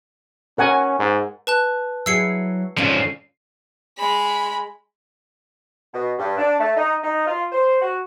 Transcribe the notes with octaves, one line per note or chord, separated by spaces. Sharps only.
C#4 A#4 F#5 G#5
G#2
B4 A5 F#6
F#3 E4 G#4 E6 C7 C#7
G#2 D3 F3 C#4 F4
G#3 B5
B2
G2
D4
A3
D#4
D#4
F4
C5
F#4